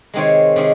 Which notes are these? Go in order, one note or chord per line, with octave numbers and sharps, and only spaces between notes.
C3 D#3 G#3 C4 C#5
C3 D#3 G#3